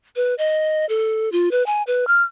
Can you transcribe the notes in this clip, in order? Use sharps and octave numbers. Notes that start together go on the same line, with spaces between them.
B4
D#5
A4
F4
B4
G#5
B4
F6